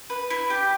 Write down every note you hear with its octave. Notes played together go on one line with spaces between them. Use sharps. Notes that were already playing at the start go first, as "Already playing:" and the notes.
B4
E4
G4